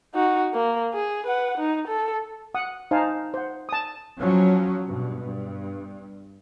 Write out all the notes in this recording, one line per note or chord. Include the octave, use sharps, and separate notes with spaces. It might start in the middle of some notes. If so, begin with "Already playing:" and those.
D#4 F#4
A#3
G#4
B4 F#5
D#4
A4
F#5 D#6
D#4 C5 F5 G#5 A5
C5 F#5
A5 D#6
F3 F#3 C#4
G2 B2
G2